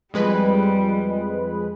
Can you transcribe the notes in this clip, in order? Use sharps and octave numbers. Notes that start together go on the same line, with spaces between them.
F2 G3 G#3 B4